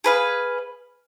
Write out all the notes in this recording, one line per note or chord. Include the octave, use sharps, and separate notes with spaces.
G#4 B4 F5